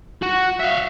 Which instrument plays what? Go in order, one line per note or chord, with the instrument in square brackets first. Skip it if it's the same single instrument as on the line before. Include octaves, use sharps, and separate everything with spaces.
[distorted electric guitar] F#4
E5 F5